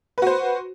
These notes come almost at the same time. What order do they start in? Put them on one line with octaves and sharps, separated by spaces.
B4 F#4 C5